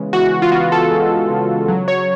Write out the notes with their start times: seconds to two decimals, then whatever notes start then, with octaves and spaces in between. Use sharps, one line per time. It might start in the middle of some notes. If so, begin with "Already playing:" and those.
Already playing: C#3 E3 G#3 B3
0.13 E3 F#4
0.42 F4
0.52 B3 F#4
0.72 A4
0.91 G#3
1.30 C#3
1.68 F#3
1.88 C#5